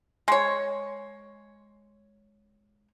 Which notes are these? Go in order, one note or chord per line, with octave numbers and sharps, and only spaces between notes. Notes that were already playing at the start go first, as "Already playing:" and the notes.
G#3 C#5